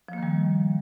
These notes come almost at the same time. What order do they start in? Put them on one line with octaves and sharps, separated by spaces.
F3 A#3 D#3 G3